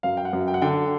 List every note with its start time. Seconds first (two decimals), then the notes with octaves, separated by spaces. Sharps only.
0.03 F#2 F5
0.17 G5
0.25 F#5
0.33 F#2
0.48 G5
0.54 F#5
0.62 D3 G5